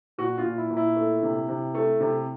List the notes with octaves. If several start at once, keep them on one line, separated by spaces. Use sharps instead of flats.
A#2 F#4
F4
A#2
E4
A#2
E4
A3
C3
C3
A3
C3